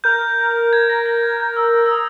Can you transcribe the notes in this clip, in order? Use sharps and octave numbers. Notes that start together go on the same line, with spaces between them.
A#4 G6
G#6
A#6
A#6
G#6
G6
E6
E6
E6
D#6